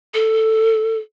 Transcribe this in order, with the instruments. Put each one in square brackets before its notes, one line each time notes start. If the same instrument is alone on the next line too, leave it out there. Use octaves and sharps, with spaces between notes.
[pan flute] A4